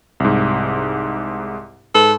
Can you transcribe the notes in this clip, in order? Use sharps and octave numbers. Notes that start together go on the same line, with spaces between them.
C2 G#2
G#2 A4 B4